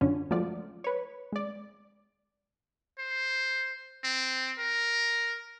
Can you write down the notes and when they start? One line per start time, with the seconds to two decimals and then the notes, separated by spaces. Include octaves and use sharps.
0.01 F#2 D3 C#4 F4
0.31 F3 F#3 G#3 A3 F4 D5
0.84 B4 C#5
1.32 G#3 D5
2.99 C5
4.04 C4
4.59 A#4